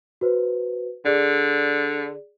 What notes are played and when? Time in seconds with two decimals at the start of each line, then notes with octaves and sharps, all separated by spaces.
0.21 F#4 B4 C5
1.05 D3 G#4 D5